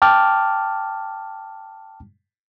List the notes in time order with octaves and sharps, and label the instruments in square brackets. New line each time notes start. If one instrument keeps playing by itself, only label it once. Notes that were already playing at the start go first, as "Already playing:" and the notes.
[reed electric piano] G5 A5 D6 F6